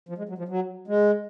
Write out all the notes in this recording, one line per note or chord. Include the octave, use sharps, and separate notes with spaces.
F3
G#3
F#3
F3
F#3
G#3